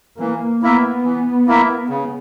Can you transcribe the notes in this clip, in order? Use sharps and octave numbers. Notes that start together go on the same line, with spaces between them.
E3 A#3
A#3 B3 E4 A#4 E5
E3
A#3 E4 A#4 E5
C#3